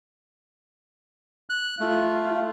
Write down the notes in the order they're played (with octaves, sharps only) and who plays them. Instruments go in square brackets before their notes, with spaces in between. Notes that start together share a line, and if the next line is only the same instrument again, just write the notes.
[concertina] F#6
[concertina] A3 [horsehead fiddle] F4